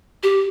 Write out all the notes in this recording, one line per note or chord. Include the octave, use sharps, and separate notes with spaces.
G4